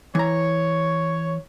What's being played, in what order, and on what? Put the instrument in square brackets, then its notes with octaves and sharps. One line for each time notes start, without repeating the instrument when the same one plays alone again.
[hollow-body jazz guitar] E3 A#5 [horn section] C#5